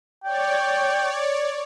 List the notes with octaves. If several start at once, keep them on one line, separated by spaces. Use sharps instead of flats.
C#5 D5 G5